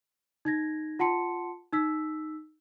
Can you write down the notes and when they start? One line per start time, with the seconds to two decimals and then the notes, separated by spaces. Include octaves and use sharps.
0.45 D#4 G#6 A#6
0.99 F4 F#5 A5 C6 C#7
1.73 D#4 E6 B6